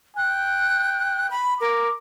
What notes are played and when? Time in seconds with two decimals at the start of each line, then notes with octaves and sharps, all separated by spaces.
0.17 G5 F#6
1.31 B5
1.61 A#4 D6